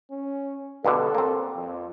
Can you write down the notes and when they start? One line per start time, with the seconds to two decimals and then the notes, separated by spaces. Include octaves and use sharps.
0.11 C#4
0.85 G2 B2 D3 A4
1.15 A#3 C4
1.56 F2